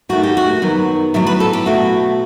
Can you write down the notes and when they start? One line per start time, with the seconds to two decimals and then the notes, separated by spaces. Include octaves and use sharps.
0.09 D#2 D#3 A3 F#4
0.23 G4
0.37 F#4
0.62 F#2 D#3 F#3 B3
1.14 A2 F#3 B3 E4
1.27 B4
1.40 A4
1.53 G4
1.66 B2 A3 F#4